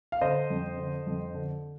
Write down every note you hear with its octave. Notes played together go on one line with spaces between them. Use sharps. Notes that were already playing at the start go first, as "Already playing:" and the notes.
F5
D3 C5 D#5
F2
D3
F2
D3